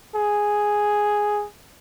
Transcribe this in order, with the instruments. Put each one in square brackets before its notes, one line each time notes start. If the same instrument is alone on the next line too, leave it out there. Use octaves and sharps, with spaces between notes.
[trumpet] G#4